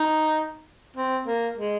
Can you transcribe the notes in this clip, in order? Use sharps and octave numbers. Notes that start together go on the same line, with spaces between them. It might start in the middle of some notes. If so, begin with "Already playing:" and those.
Already playing: D#4
C4
A#3
G#3